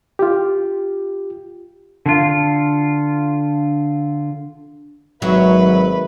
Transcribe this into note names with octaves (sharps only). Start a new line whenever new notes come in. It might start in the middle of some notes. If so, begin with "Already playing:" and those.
F4 G4
D3 F4
G#1 F#3 A#4 B4 E5